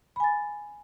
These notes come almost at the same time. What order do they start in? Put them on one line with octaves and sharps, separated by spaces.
B5 G#5 A6